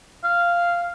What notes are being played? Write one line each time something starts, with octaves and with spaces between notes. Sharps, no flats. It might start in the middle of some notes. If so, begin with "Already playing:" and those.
F5